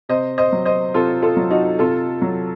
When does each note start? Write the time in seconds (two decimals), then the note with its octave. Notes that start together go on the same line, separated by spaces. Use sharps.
0.09 C3 C5 D#5
0.38 C5 D#5
0.52 F#3
0.65 C5 D#5
0.94 C3 F4 A4
1.22 F4 A4
1.37 F#3
1.51 D#4 F#4
1.79 C3 F4 A4
2.22 F#3